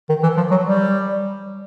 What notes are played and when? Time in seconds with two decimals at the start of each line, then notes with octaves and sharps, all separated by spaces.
0.09 D#3
0.23 E3
0.37 F3
0.51 F#3
0.65 G3